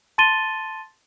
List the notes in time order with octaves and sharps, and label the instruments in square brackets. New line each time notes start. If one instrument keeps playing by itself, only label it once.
[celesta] A5 C6 A6 D#7 G7